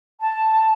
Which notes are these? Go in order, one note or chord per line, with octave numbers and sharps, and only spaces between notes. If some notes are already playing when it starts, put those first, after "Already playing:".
A5